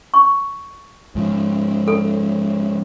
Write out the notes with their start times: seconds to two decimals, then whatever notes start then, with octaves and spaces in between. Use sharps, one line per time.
0.14 C#6
1.15 G#2 F3
1.88 A4